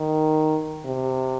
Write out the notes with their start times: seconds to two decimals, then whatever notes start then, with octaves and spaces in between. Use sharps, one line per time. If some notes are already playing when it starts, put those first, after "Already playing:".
Already playing: D#3
0.85 C3